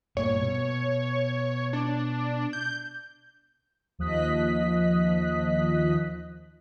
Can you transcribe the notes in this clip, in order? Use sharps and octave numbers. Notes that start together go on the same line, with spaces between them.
G2 A#2 C#5
B2
D4
G6
D#2 F3 D#5 F#6 B6